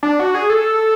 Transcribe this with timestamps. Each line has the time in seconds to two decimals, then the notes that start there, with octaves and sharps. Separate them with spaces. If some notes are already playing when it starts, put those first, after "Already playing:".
0.03 D4
0.19 F#4
0.35 G#4
0.50 A4